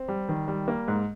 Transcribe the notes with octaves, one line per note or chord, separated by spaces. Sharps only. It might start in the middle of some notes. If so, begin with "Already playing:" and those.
Already playing: C4
G3
D#3
G3
A#3
G#2